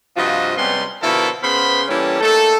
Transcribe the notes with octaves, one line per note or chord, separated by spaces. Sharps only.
G2 C3 F3 F4 F#4 D#5
C3 G3 G#3 B3 C#4 C6
B2 D3 F3 E4 A4 A#4
C#3 B3 A#4 C5 B5 C6
E3 G3 A#3 C#4 G4 A4
A3 A#3 D#4 A4